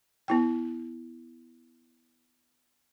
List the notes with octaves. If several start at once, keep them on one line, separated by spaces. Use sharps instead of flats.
B3 E4 G5